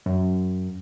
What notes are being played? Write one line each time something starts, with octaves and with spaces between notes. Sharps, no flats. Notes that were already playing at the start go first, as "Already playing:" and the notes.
F#2